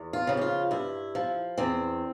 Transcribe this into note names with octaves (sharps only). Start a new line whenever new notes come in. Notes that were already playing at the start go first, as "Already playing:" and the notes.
Already playing: E2
F4
C#3 F3
G4
F4
G2 E4
F3
E2 C4